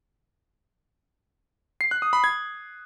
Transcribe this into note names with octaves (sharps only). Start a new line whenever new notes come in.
C7
F#6
D#6
B5
G#6